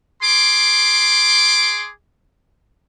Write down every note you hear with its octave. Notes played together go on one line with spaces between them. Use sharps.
G#4 C6 D6